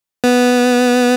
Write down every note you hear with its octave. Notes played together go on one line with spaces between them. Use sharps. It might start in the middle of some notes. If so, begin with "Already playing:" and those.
B3